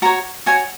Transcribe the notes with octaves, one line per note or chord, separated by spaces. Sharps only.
F#4 C#5 A#5
F#4 C#5 G#5